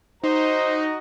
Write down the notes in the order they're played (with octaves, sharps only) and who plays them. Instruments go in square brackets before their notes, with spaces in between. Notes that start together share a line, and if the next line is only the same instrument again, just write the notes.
[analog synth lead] D#4 [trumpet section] F#4 D#5 A#5 [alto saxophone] C5